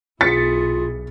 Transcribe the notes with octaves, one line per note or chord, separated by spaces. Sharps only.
B1 E4 F4 G#4 A6 B6 C#7